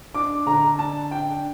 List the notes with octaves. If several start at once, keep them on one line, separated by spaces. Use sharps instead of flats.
D4 D6
D3 A#5
D3 A5
D4 G5